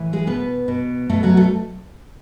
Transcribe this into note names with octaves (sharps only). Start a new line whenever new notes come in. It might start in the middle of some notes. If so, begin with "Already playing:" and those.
Already playing: A2 E3
G#3 G#4
B2 B3 B4
B2
B2 A3 A4
F#3 F#4
A3 A4